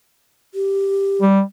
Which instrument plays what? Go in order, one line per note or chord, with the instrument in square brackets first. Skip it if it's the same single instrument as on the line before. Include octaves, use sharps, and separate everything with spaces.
[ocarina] G4
[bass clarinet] G3